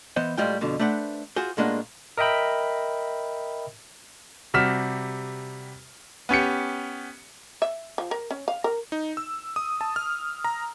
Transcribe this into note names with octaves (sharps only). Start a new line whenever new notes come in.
E3 B3 C5 D#5
A2 G3 G#3 F4 G5
F2 B2 D3
A3 D4 B4 C5 F#5
F4 F#4 G#4 C5
A2 G#3 A#3 D4 F4 F#5
A#4 D#5 E5 G5 B5
C3 G3 F#4 F6 B6 E7
B3 C#4 G4 C#7
E5
F3
A#4
C#4
F5
A#4
D#4
E6
D#6
A5
F6
A#5